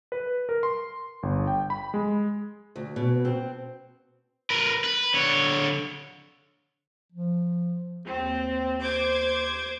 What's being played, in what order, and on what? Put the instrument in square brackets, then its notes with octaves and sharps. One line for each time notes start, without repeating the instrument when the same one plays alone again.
[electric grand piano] B4
A#4
C6
G1
G5
B5
G#3
[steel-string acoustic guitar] D2
B2
C4
[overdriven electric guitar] A#4 B4
B4
D3 C#5
[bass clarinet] F3
[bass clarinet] D#2 [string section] C4
[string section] C5 D6 G#6